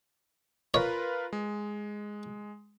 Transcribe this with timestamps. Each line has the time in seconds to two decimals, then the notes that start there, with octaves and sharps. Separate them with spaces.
0.74 F4 A#4 B4 C#5
1.33 G#3